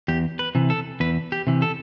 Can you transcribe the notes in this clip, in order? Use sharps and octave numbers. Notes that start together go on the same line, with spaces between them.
E2 G4
B4
C3 E3
A4
E2 B4
G4
C3 E3
A4